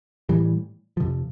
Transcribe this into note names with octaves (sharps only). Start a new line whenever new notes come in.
A2 E3 G3
F2 C3 F3